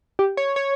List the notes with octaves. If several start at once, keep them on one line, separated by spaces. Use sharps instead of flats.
G4
C#5
C#5